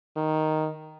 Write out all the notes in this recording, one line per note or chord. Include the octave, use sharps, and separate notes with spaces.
D#3